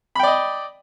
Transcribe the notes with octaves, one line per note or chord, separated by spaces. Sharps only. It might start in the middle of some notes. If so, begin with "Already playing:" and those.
D5 D#5 G5 B5